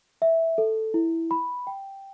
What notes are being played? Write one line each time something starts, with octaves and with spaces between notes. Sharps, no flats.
E5
A4
E4
B5
G5